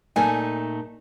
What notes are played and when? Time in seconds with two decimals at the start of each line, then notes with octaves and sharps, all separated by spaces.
0.16 A#2 A3 D#4 G#5 A5